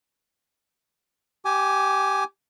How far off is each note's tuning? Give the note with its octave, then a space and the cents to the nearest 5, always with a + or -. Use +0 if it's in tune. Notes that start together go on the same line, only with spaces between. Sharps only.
G4 -10 G#5 +5 D6 +30